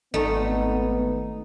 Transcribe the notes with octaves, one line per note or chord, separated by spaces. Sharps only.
G#1 A3 B3 D#4